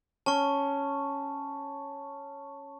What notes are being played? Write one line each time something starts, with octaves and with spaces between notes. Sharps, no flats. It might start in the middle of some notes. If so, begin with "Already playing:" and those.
C#4 A5 C#6